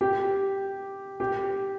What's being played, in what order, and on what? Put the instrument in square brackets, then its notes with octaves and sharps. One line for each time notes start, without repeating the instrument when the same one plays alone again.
[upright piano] G4
G4